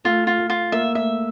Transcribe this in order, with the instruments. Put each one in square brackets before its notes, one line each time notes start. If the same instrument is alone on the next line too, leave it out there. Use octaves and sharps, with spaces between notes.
[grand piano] A3 [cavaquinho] F4
[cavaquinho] F4
[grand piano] A3
[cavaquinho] F4
[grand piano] A#3 [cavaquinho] E5
[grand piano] A3 [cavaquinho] E5